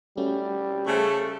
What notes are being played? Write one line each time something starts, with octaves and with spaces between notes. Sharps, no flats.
G3 A3 C#4 F#4
C#3 A3 A4 C5